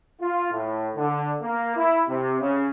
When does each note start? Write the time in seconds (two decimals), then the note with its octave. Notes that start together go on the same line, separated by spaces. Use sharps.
0.20 F4
0.51 A2
0.95 D3
1.42 A#3
1.76 E4
2.08 C3
2.41 C#3